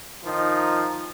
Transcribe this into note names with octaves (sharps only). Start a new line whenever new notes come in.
D#3 F3 D#4